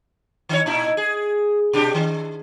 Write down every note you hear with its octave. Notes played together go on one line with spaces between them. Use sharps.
D#3 D#4 C#5
A#2 D#4 E4
G#4
B2 D4 G4
D#3